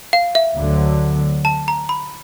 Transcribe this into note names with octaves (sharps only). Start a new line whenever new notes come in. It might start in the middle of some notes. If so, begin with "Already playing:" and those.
F5
E5
D2 D3 F#3
A5
A#5
B5